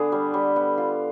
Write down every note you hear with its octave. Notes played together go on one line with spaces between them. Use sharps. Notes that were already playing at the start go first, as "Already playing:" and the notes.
Already playing: D3 B3 G#4
G3
G3
B3
F4